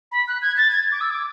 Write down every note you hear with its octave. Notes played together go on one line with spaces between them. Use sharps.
B5
F#6
G#6
A6
G#6
D6
E6
D6